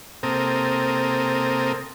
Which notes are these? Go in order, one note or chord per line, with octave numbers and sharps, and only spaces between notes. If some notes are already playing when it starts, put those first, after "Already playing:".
C3 A#3 C4 A4 A#4 D#6